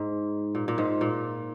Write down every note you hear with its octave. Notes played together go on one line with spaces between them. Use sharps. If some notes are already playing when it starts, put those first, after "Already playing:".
Already playing: G#2
A#2
A#2
G#2
A#2